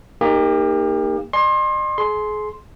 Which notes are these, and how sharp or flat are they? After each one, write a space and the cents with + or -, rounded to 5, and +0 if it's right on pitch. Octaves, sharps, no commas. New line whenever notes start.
A#3 +0 D#4 +0 G4 +35
D#5 -45 G#5 +0 C6 +30
G#4 +35 C6 +0